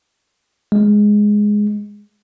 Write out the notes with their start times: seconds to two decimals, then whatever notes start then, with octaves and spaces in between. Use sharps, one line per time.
0.72 G#3